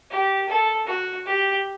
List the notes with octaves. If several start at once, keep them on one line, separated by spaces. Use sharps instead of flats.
G4
A4
F#4
G4